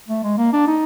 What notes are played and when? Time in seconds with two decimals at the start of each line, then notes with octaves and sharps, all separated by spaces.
0.08 A3
0.23 G#3
0.37 A#3
0.53 D4
0.67 D#4